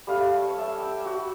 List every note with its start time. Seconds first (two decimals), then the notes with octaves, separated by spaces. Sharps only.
0.07 G3 A3 F5
0.42 C#5
0.58 E5 A5
0.78 G5 E6
1.05 F#4